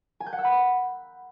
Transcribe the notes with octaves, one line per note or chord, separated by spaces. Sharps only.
G#5
G6
F#5
E6
B5